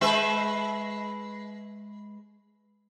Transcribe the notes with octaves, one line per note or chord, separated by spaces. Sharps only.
G#3 B4 E5